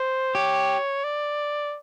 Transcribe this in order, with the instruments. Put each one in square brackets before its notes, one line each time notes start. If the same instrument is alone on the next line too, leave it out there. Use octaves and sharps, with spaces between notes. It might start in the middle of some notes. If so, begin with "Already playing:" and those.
Already playing: [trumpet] C5
[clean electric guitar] G4 [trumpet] C#5
[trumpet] D5